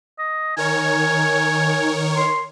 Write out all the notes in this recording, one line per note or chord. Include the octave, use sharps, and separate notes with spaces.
D#5
D#3 A#4 C#5 G#5
C6